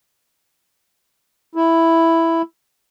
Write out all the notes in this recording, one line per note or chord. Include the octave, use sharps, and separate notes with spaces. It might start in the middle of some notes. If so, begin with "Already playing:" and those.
E4